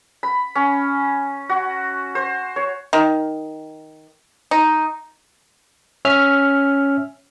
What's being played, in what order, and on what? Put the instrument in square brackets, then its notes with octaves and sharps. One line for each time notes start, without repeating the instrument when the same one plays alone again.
[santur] B5
C#4
F#4
C5
C#5
[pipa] D#3
D#4
[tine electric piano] C#4 E5 F6